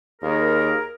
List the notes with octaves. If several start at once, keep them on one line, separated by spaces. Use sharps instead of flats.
D#2 G#4 A#4